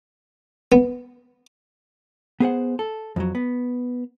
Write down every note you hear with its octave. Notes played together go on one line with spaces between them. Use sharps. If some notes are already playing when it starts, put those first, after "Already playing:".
B3
B3 G#4 C5 F#5
A4
F2 E3 F#3
B3